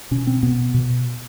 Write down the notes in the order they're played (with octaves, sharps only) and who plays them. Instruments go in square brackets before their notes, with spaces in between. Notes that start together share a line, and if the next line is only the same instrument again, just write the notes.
[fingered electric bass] B2 C#4
C4
B2 B3
B2